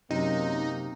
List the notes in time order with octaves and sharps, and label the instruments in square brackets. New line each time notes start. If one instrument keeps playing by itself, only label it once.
[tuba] F#2 [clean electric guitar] C3 [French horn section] A#3 [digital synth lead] D#4